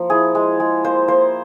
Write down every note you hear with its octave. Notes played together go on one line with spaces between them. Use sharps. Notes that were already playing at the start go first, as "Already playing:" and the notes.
Already playing: F3 A#3
E4 G#4
G#3
G#3
A#3 C5
A#3 C5